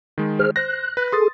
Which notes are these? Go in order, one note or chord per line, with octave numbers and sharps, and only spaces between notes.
D#3 G#3
G#4 C5 F6
C5 F#6 A#6
B4
G#4 A4 C6 D#6 A6